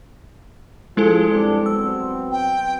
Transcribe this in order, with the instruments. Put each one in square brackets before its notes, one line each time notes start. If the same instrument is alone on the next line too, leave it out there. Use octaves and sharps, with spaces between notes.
[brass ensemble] F3 G#4 [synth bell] G#3 E4 A4
[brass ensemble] G2 C4 D4
[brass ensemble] F#3 B3 C4 [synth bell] E6
[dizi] G5